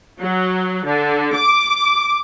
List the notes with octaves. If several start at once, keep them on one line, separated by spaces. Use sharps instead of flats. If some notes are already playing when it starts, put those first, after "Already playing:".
F#3
D3
D6